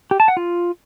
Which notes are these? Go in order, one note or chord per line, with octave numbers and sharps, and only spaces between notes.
G4
A5
F#5
F4